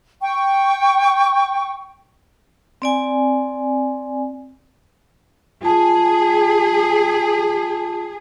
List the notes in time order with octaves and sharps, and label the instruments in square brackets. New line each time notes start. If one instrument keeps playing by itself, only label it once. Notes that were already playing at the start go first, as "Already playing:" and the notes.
[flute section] G5 C#6
[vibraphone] C4 D5 G#5
[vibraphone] F4 A5 [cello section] G#4